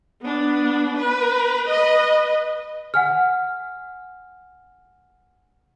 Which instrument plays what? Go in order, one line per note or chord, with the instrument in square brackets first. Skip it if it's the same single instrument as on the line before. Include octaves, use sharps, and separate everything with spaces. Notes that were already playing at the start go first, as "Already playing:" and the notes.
[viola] B3 D4
B4
B4 D#5
[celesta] F#5 G#5 F6